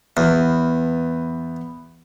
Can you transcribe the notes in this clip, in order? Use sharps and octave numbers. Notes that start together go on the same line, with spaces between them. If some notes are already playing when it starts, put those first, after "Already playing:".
E2 B3